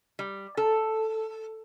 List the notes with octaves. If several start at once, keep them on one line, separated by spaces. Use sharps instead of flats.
G3
A4